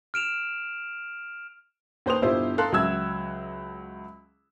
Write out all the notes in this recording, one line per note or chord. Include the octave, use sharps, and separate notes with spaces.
F6 D7 E7 F7
D#2 B4 C5 C6 D#6 F7
G1 B2 E4 F4 G4 C5
A4 A#4 F5 C6 F#6
C#2 F#3 E5 E6 G#6